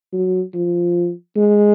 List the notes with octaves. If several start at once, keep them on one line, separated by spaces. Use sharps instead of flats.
F#3
F3
G#3